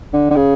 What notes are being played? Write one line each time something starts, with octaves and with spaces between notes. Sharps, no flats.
D3
D3
C#3